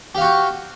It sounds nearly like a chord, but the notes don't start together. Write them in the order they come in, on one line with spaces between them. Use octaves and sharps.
G4 F5 F#4 G5